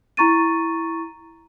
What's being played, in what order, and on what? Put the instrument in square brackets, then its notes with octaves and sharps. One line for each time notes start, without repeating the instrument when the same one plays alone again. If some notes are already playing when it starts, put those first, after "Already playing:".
[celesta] E4 A#5 C#6 A6 D#7